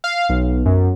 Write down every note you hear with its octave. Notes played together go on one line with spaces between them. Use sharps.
F5
B1
F#2